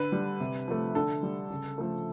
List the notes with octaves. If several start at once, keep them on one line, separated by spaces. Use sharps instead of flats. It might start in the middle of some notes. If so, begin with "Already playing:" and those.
Already playing: D3 B4
G3
C3
F3 A3
D3 A4
G3
C#3
F3 A3